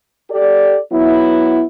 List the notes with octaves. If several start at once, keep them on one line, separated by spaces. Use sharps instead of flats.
G4 A4 D5
F#3 B3 E4